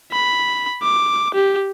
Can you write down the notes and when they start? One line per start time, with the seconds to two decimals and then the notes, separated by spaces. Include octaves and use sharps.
0.12 B5
0.83 D6
1.34 G4